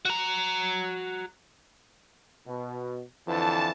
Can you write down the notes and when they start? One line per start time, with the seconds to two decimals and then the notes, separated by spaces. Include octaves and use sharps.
0.05 F#4 A#5
2.47 B2
3.27 F2 D3 E3 A5